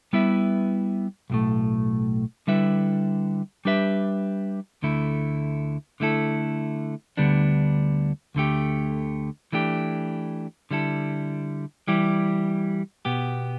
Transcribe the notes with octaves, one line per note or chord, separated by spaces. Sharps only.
G3 B3 E4 B4 E5
B1 A2 A3
D3 G3 E4 B4 E5
G3 D4 G4 B4 E5
D2 D3 A3 E4
D3 A3 E4 A4
D2 D3 G3 B3 D4
D2 D3 A3 G4
E3 A3 D4 G4
D3 G3 E4 A4
E3 G3 E4 G4
B2 B3 G4